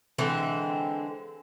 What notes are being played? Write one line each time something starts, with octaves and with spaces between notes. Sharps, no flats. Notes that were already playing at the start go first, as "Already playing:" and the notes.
D3 E3 G#3 C4